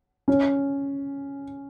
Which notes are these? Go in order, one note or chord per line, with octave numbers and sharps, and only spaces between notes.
C#4